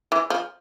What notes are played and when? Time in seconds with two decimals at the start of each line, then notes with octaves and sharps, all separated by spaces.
0.12 E3
0.30 F3